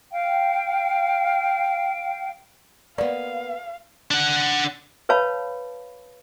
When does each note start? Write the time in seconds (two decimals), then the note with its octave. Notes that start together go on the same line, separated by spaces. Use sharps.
0.11 F5 G5
2.98 A#3 B3 D5 F5
4.11 D4 F#5
5.09 B4 C#5 F5 A5 B5